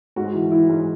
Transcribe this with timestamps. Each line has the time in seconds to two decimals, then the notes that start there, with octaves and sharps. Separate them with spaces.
0.16 G#2 F#4
0.34 E3
0.52 E3 E4
0.69 G#2